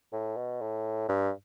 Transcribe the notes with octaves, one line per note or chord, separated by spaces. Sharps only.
A2
B2
A2
G2